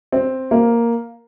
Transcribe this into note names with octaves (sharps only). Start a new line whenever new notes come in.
C4
A#3